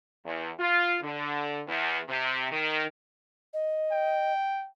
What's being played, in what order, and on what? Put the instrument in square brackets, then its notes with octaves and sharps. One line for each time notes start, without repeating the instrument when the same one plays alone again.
[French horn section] E2
F4
D3
E2
C3
D#3
[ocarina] D#5
[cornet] G5